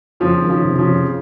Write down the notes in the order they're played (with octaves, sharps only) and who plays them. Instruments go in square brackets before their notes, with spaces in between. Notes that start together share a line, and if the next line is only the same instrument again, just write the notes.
[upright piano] F2 [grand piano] C#3 F3
[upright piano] D#3
[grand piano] C#3 F3
[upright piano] C3
[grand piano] C#3 F3
[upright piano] F2